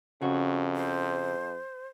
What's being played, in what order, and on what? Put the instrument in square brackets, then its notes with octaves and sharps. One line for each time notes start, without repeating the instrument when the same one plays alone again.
[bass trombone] F2 [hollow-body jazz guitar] C#3 F#4
[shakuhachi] C5